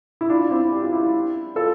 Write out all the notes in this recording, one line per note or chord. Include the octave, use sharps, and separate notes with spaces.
E4
D4 F4
C4 E4
G4
F4
E4 G4
F4 A4